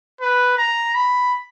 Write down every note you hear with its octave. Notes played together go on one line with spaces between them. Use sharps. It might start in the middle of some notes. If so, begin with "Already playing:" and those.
B4
A#5
B5